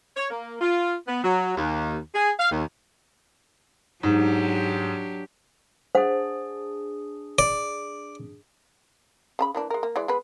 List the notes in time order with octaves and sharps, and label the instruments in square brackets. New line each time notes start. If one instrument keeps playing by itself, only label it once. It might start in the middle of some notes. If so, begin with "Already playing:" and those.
[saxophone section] C#5
A#3
F4
B3
F#3
D#2
G#4
F5
D#2
[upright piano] G#2 [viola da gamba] F#3 D4 G4
[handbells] D4 G#4 [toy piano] C5 F#5
[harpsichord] D5
[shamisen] C#3 A5 B5
E3 A#3 D4
G#3 A#4
A#3
E3 G#3 D5
G#3 B3 B4